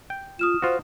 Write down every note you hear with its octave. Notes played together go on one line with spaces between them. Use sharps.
G5
F4 D#6 F6 E7
F4 F#4 C5